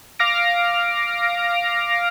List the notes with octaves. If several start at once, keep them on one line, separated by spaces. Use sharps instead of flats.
F5 D6 F6 A#6 D7